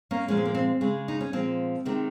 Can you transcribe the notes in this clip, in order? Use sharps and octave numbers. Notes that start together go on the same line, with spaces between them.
A#3 C#4
A#2 F3 G#3 C#4
C4
A#3
C4
C#3 G#3
D#4
C#4
A#2 F3 G#3 C4
C3 D#3 G#3